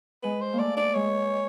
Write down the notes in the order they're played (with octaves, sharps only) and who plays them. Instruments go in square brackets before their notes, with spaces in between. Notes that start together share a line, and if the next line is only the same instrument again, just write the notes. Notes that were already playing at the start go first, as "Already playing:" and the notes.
[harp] G#3 [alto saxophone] B4
[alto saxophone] C5
[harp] A#3
[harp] A3 [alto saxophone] D5
[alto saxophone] D5
[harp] G#3 [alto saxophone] C#5